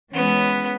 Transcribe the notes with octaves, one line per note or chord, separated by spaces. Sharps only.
E3 G#3 B3 C#4